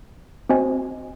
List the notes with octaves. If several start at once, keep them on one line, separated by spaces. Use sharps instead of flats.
C4 F#4 C5 D#5 G#5